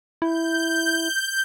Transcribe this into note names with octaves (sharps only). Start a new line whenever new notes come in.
E4 G6